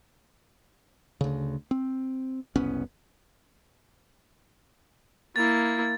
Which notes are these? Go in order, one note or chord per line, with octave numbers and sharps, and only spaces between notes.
D2 C#3
C4
F#1 C2 B3 C#4
A#3 E4 A6